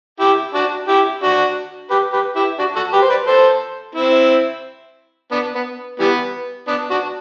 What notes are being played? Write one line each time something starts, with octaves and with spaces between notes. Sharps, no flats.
E4 G4
D4 F#4
E4 G4
D4 F#4
G4 B4
G4 B4
E4 G4
D4 F#4
F#4 A4
G4 B4
C5
B4 D5
A4 C5
C4 E4
B3 D4
B3
E3 G3 B3
B3 D4
D4 F#4